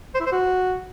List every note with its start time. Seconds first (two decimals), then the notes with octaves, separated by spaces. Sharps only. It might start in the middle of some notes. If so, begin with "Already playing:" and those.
0.15 C5
0.20 E4
0.26 C5
0.32 F#4